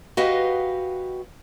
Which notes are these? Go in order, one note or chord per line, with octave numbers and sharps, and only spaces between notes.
F#4 G4 B4 D#5 F5